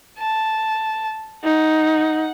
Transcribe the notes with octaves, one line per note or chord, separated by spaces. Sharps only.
A5
D#4 F#5